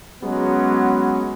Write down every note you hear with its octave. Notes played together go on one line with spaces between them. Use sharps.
F#3 G#3 B3 C#4